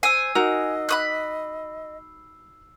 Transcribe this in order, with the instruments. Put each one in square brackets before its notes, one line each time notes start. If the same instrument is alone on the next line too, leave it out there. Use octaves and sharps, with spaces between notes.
[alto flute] C5 [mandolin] G#5 [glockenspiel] E6 C7
[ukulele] D#4 F#4 A#4 [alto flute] D#5 [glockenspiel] E6
[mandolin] B5 D#6 F#6